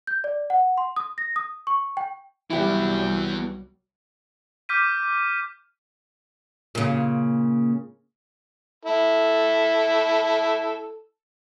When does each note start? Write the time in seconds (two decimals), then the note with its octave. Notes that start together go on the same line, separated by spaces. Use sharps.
0.07 G6
0.24 D5
0.50 F#5
0.78 C6
0.96 D#6
1.18 A#6
1.36 D#6
1.67 C#6
1.97 G5
2.50 C2 E3 F#3 G3 B3 E4 G4
4.69 D6 F6 G6 B6 D#7
6.75 A#2 C#3
8.85 E4 A4